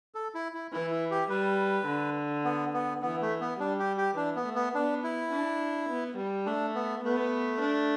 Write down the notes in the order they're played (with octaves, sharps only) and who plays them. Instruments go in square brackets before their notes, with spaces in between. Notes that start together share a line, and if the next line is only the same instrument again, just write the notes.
[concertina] A4
E4
E4
[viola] E3 [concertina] E4
[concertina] E4
G4
[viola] G3 [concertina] B4
[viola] D3
[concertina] B3
B3
[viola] E3 [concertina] B3
[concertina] A3
B3
[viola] G3 [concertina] D4
[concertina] G4
G4
[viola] E3 [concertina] D4
[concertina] B3
[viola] A3
[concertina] B3
[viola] B3 [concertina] D4
[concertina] E4
[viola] D4
B3
G3
[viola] A3 [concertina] D4
[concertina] B3
[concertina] A3 [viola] B3
[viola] D4